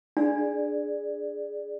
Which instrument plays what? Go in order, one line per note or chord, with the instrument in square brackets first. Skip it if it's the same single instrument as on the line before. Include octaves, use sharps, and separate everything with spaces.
[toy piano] D4 [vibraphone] G#4 D5